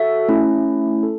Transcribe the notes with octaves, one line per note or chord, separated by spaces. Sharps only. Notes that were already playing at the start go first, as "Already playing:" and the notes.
Already playing: F#4 A4 E5
A3 C#4 E4
A4